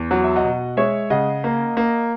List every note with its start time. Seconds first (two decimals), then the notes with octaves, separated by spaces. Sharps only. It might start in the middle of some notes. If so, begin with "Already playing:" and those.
Already playing: E2
0.11 F#3 F#5
0.24 E5
0.36 D#5 F#5
0.44 B2
0.77 G#3 C#5 E5
1.10 C#3 D#5 F#5
1.44 A#3
1.77 A#3